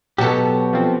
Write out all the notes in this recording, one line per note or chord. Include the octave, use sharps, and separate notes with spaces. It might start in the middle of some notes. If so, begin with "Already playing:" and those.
B2 F#3 B3 F#4 G4 A4
F3 C4